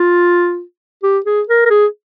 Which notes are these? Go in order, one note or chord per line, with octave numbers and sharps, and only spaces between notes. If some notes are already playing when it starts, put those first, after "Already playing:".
Already playing: F4
G4
G#4
A#4
A#4
G#4